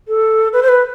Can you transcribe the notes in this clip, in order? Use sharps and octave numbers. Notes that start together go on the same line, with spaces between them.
A4
B4
C5
B4